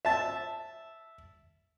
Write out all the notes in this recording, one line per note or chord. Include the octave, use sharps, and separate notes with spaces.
E5 A5